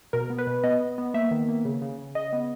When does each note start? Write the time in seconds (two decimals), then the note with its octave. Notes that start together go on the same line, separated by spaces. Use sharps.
0.13 B2 A#4
0.30 B3
0.39 B4
0.47 B2
0.64 B3 D#5
0.81 B3
0.98 B3
1.14 A#3 E5
1.31 D#3
1.48 A#3
1.65 C#3
1.82 C#3
1.99 C#3
2.15 C#3 D#5
2.33 B3